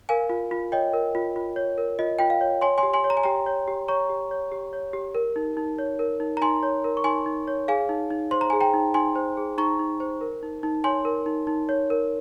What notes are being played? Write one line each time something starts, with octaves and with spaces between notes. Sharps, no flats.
A#4 F5 G#5
F4
F4
C#5 D#5 G5
A#4
F4
F4
C#5
A#4
F4 D#5
F4 G5
F5
C#5
C#5 G#5 C6
G#5 C6
G4
G#5 C6
C#5
A#5
G#5
G4 G5 A#5
C#5
G4
C#5 A#5 C#6
G4
C#5
G4
C#5
G4
A#4
D#4
D#4
C#5
A#4
D#4
A#5
D#4 G#5 C6
C#5
A#4
C#6
D#4 G#5 C6
D#4
C#5
G#4 F5 G#5
D#4
D#4
C5 C6
A#5
G#4 G#5
G5 A#5
D#4
D#4 G#5 C6
C5
G#4
D#4 A#5 C#6
D#4
C5
A#4
D#4
D#4
C#5 G#5 C6
A#4
D#4
D#4
C#5
A#4